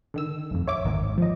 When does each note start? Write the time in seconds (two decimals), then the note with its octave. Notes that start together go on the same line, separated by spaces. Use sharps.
0.14 D3 D#3 E6
0.51 A#1 F2
0.68 C#5 E5 D6
0.85 G#1 D#2 G#2 D#3
1.18 F3 D#5